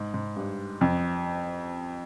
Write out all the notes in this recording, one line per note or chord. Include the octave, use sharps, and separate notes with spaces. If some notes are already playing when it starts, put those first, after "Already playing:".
Already playing: G#2
G#2
G2
F2